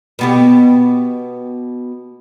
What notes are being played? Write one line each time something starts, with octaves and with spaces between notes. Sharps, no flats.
B2 B3 G4